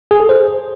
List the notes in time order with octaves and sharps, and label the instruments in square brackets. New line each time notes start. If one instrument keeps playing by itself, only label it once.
[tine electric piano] G#4
A4
C5